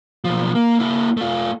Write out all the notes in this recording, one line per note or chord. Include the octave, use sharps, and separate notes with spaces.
B1 F3
A#3
A#3 E4
A3 F4